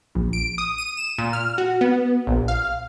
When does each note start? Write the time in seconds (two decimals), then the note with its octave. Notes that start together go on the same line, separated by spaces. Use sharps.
0.15 A#1
0.33 D7
0.58 D#6
0.78 D#7
0.97 E7
1.18 A#2
1.33 F6
1.58 F#4
1.81 B3
2.27 A#1
2.48 F5